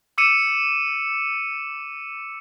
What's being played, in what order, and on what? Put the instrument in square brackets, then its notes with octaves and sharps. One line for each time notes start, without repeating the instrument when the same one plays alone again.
[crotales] D6 E6 C#7 D#7 E7